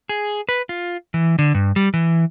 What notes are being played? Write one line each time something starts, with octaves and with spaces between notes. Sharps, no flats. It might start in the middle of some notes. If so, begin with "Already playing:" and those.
G#4
B4
F4
E3
D3
G2
G3
E3